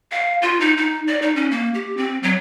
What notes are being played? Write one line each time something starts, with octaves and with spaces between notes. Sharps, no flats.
F5
F4
D#4
D#4
D5
D#4
C#4
A#3
G4
C4
F#3